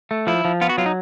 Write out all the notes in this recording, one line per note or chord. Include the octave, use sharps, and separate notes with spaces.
A3
F3 E4
F3
B3 F4
F#4
F#3 F4
D#4